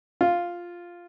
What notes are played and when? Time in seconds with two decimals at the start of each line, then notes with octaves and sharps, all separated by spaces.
0.21 F4